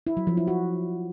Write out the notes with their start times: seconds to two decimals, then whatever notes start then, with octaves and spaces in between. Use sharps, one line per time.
0.07 E4
0.17 F#3
0.27 F3
0.37 E4
0.48 F#4